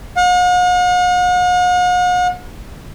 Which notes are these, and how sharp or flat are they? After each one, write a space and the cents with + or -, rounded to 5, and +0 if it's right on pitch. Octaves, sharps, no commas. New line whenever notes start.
F#5 -45